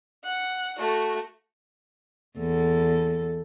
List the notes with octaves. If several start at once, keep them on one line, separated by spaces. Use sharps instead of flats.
F#5
A3 F#4
E2 A4